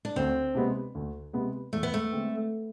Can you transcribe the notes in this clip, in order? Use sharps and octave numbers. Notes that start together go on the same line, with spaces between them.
D4
D2 C4
C3 G#3 B3
D2
C3 G#3 B3
E2 A3
B3
A3
D3 G#3 C4